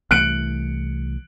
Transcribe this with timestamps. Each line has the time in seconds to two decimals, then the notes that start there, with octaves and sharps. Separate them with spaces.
0.11 C2 E3 A3 F#6 C#7 D7